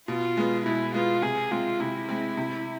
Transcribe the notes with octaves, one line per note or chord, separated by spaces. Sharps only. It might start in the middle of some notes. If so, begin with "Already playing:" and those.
B2 F4
G#3 B3
B2 E4
G#3 B3 F4
C3 G#4
G#3 C4 F4
C3 E4
G#3 C4
C3